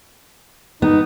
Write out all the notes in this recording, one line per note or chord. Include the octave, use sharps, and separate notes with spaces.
B3 D#4